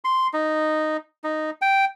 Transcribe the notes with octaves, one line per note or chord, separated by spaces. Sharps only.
C6
D#4
D#4
G5